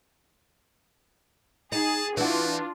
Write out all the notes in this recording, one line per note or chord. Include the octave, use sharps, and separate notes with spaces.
D#4 G#4 A5
E3 D4 D#4 F4 F#4